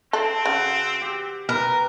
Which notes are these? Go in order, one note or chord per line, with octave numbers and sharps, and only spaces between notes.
C4 A4
C#3 F#4
G4
A#4 B4